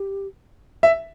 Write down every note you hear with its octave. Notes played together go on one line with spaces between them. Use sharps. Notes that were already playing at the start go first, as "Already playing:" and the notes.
Already playing: G4
E5